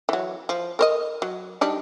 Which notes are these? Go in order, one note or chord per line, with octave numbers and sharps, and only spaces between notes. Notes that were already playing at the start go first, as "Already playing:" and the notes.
E3 F#3
F3
A#4 C5 D#5
F#3
G3 D4 D#4